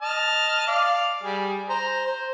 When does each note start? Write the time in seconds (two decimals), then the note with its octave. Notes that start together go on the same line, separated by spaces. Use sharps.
0.02 D#5 A5 F6
0.68 D5 F5
1.23 G3 G#4
1.69 C5 A#5
2.06 C5